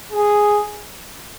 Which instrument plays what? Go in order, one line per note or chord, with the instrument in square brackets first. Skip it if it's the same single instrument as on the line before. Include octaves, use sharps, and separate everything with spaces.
[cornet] G#4